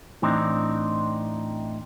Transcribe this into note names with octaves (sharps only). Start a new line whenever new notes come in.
A2 E3 C4 D4 D#4